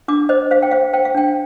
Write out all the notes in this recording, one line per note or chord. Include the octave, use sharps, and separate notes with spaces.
D4 D6
C5 D#5
C5 F5
G5
C5 F5
C5 G5
F5
D4 G5